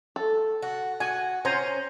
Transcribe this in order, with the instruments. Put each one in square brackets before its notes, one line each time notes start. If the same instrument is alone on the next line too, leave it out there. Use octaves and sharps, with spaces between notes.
[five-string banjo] A4
[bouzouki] F#4
[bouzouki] F#4 [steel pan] G#5
[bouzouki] C#4 [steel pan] C5 G#5 A#5